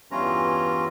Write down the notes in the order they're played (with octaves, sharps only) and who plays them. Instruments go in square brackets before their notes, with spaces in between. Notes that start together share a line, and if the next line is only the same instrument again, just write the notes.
[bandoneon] E2 G2 E3 C#4 F4 A#5